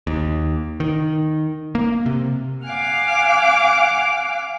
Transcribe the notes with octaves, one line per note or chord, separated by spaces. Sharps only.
D#2
D#3
A#3
C3
F5 F#5 G#5 D6